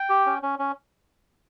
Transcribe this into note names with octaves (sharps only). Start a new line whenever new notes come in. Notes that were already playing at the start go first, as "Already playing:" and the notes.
Already playing: G5
G4
C#4
C#4
C#4